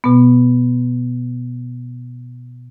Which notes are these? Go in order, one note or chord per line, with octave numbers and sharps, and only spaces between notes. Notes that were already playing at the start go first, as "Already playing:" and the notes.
B2 B3